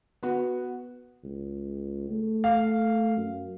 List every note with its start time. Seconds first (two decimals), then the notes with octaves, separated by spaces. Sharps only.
0.23 B3 F#4
1.24 C#2
2.11 A3
2.44 F5
3.17 F#2